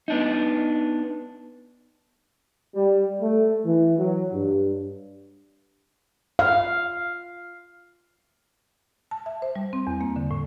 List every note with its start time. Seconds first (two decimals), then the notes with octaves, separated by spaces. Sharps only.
0.08 B3 D4 D#4
2.75 G3
3.21 A3
3.65 E3
3.99 F#3
4.33 G2
6.39 F5
9.11 A5
9.26 E5
9.42 C5
9.56 G3
9.73 C4
9.87 E2
10.01 A#3
10.16 D3
10.31 A2